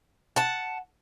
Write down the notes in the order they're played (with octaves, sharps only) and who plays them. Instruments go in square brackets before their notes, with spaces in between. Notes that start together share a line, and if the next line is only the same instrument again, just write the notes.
[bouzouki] F#5 A5